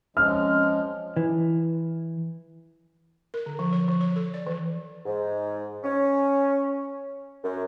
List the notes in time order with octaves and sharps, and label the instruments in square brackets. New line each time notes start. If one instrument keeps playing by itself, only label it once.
[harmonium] F3 G#3 [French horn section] C4 C#4 [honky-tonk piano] F6
[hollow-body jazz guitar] E3
[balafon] A#4
D3
F3
C#5
F3
C#5
A4
D5
E3
[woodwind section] G#2
C#4
F#2